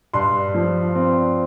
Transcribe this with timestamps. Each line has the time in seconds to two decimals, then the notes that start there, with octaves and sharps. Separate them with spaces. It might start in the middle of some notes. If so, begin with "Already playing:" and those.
0.13 G2 C6
0.54 F3
0.95 C4